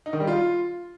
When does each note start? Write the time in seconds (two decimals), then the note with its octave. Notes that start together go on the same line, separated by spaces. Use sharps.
0.06 D#4
0.13 D#3
0.20 G3
0.27 F4